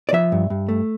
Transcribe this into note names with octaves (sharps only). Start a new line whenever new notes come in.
D5
F3 E5
G2
G2
A3